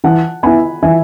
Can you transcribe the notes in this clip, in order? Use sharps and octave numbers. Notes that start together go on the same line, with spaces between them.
E3 F#5 A5
B3 E4 G#5 B5
E3 E5 G#5